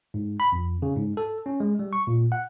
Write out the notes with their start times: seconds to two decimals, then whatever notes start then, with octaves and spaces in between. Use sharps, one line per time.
0.14 G#2
0.40 B5
0.52 F2
0.82 C#3
0.96 G#2
1.17 A4
1.46 C#4
1.60 G#3
1.79 G3
1.93 C#6
2.07 A#2
2.32 F#5